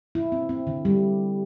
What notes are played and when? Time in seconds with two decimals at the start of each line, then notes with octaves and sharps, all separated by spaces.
0.15 E4
0.32 C4
0.49 C4
0.67 D3
0.85 G3